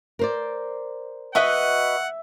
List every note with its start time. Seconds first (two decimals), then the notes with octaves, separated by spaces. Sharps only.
0.19 A#4 C5 D5
1.35 F#4 B4 D#5 E5 F#5